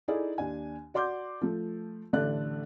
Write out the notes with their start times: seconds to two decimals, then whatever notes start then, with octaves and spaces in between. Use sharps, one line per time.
0.08 D#4 E4 G#4 A4 D5
0.38 D#2 D4 G#5
0.94 F#4 D5 C6 D6 G6
1.41 F3 A3
2.13 A1 D3 A3 D5 F#6